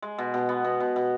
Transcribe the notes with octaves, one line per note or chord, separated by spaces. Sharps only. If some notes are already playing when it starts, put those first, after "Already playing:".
G#3
B2
B2
B3
B2
B2
B2